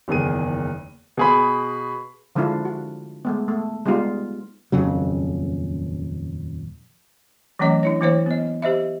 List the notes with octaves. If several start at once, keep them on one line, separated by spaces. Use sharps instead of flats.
F#1 E2 D#3 G#4 D#7
B2 G#4 B5
D3 F3 G#3 D4 E4 F4
F#4
G#3 A3 B3
A3
G3 G#3 B3 D#4 F4
D#1 F2 C#3 F#3
E3 F#3 A3 C#4 C#5 D#5
D4 E4 C#5
E3 A#3 E4 C5 C#5
B3 D#5
G4 C5 D#5 E5